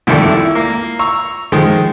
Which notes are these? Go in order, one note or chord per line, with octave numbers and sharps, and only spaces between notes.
C2 F2 D#3 E4 A4 D5
E4
A#3
A#5 C#6 E6
D#3 F3 G#3